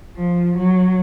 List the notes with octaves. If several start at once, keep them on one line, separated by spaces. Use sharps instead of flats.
F3
F#3